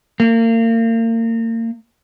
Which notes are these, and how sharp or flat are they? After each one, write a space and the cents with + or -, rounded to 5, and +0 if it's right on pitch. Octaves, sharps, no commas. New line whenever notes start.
A#3 -35